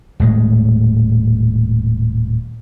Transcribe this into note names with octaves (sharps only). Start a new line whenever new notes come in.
D#1 A2 G#3